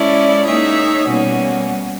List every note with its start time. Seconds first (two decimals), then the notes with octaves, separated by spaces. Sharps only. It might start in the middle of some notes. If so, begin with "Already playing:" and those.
Already playing: G#3 C#4 E4 A4 D5
0.45 A#3 D#4 G#4 C#5 E5
1.08 B2 G3 A#3 C#4 F#4